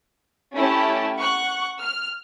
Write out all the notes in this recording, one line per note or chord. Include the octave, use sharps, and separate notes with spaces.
A3 C#4 E4 G4 A5
F#5 C#6 F#6
F6